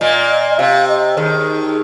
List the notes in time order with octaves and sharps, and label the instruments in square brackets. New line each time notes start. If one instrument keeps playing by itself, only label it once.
[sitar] A#2 A#3 [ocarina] D#5
[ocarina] D#5
[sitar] C3 [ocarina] F5
[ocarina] D#5
[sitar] D#2 D#3 [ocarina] G#4